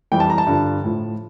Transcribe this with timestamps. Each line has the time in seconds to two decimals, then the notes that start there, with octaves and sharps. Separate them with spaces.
0.12 F2 E3 G3 G5
0.20 A5
0.30 A#5
0.38 A5
0.47 G2 D3 F3
0.84 A2 F3